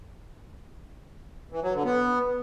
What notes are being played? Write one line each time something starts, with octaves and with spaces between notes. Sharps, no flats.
E3
F#3
D3
B3